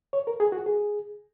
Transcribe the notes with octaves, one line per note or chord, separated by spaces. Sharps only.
C#5
A#4
G#4
F#4
G#4